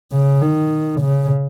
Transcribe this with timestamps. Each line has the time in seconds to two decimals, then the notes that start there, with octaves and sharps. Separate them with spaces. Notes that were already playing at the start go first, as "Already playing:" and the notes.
0.12 C#3
0.42 D#3
1.01 C#3